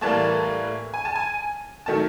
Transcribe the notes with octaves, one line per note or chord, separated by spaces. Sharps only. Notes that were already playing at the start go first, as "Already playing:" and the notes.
A2 E3 G3 A#3 A5
G#5
A5
G#5
D#3 F#3 A3 A5